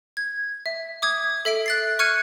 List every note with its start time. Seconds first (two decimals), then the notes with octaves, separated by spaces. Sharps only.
0.17 G#6
0.66 E5
1.02 D6 D#6 G#6
1.45 A4 E5 B6 D7
1.66 F#6 A6 C7
1.99 C#6 F6 F#6 G#6 C#7 D#7